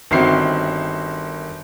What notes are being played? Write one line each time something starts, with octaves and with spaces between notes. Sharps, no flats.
G1 D#3 C4 F#4 E5 C7